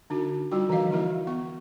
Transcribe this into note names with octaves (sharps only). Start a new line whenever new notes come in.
D3 D4 D#4 F#4
G3 D#4 F4 F#4 G5
D3 E3 F3 F#4 D#5 F5
A#3 D#4 E4 F#4 A#4 E5
B3 C#6